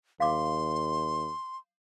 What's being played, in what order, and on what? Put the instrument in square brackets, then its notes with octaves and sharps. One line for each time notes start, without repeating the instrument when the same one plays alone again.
[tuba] D#2 [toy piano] F5 D6 [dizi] C6